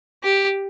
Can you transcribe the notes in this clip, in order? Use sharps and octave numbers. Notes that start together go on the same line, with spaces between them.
G4